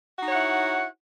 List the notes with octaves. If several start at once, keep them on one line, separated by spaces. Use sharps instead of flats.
D#4 E4 F#4 C#5 F#5